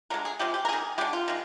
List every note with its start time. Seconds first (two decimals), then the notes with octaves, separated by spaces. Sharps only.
0.10 D3 G#3 A#4
0.25 G#4
0.39 C3 F3 G#3 G4
0.54 G4
0.65 A#4
0.69 A#3 G#4
0.73 D#3
0.98 G#3 G4
1.01 D3
1.13 F4
1.28 D#3 G#3